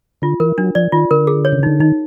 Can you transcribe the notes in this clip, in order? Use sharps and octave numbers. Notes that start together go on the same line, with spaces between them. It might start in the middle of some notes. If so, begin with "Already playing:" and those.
D3 F4
E3 A#4
F#3 D4
F3 D5
D#3 F4
D3 A#4
G#4
C#5
C#3
D3 D#4
D#3 D#4